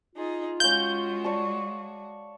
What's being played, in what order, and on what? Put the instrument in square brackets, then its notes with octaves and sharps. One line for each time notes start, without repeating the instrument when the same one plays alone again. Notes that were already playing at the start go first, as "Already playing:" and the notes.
[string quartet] D#4 G#4 [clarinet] F4
[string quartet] G#3 F#4 [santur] C#4 F5 [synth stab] G6
[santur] C#5 D5 A5